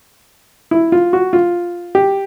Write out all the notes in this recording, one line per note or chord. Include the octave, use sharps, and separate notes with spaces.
E4
F4
F#4
F4
G4